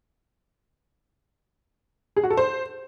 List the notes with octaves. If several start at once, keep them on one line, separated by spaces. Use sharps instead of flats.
G#4
F#4
A4
C5